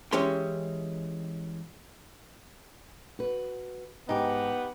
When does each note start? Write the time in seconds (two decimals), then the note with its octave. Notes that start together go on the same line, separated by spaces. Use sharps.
0.12 E3 G#3 C#4 G4 C6
3.19 F#4 B4
4.09 G#2 B3 D#4 G4